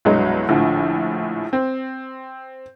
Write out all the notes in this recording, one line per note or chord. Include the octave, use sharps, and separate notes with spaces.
C2 G2 B2 F#3 G#3
A#1 A2 D3 F3
C4